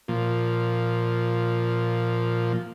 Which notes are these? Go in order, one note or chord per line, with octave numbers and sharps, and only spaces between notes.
A#2 F3